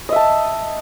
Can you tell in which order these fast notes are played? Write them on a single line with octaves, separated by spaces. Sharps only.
D#5 E5 A5